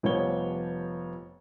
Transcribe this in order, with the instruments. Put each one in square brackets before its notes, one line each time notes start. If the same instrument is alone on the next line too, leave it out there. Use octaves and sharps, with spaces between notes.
[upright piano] F1 F3 G3 B3 C#5 G7